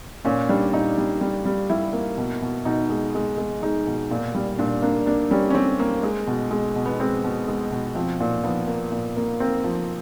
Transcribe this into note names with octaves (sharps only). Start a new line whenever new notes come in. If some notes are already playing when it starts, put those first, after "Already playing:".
A#2 C#4
G3 D4
A#2 D#4
G3
G3
G3
G3 E4
A#3
B2
B2
B2 D#4
G#3
G#3
G#3
G#3 D#4
B2
A#2
G3
A#2 D4
A#3 D4
A#3 D4
G3 C#4
C#4
G3 C4
A#3
G#3
B2
G#3
B2
B3
G#3 C4
B2
G#3
B2
F3 C4
A#2
F3 B3
A#3
A#2
A#3
A#3 C4
F3